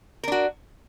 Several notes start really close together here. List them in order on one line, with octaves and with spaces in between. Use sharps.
A#4 D4 F#4